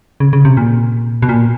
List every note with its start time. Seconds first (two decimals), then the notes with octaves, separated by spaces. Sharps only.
0.20 C#3
0.33 C#3
0.45 C3
0.57 A#2
1.22 B2
1.29 A#2